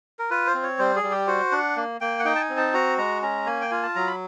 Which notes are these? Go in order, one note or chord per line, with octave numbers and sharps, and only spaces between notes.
A#4
F4 B4
C5
C4
C#5
G3 C5
G#4
G3
G4
F#4 C5
D4 F#5
A#3
A#3 G5
F#5
D#4 G5
A5
G#5
C4
A5
F#4 A#5
G#3 A#5
C#4 A#5
A#3 G#5
G5
F4 G#5
A5
F#3 A#5
B5